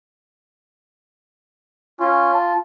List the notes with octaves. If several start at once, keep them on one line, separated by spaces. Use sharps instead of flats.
C#4 F4
A5